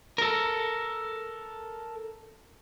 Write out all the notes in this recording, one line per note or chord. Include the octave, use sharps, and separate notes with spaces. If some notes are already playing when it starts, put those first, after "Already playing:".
A4 A#4